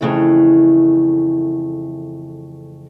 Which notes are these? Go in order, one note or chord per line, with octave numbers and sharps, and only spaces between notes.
F2 A#2 C#3 E3 A3 E4